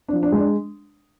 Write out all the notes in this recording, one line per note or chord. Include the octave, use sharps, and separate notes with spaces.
D4
F3
D4
G#3
D4